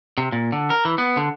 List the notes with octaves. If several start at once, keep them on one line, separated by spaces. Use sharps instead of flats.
C3
A#2
D3
A#4
E3
B3
D3